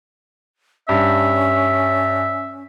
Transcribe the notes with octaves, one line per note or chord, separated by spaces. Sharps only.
G2 C#4 E5